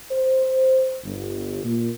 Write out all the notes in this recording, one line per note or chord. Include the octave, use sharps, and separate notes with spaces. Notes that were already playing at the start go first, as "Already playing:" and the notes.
C5
G1
A#2